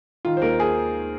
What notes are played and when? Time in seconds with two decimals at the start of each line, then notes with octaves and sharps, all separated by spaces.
0.25 D#3 F4
0.37 C5
0.42 D#2 A#4
0.60 G#4